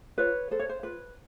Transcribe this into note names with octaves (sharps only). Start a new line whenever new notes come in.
F4 B4 C#5
A4 C5
C#5
C5
F4 B4